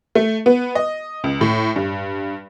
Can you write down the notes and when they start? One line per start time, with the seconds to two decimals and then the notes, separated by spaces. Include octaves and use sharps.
0.15 A3
0.46 B3
0.75 D#5
1.24 C#2
1.41 A2
1.76 G2